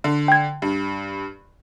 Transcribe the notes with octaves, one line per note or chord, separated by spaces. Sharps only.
D3
G5 G#6
G2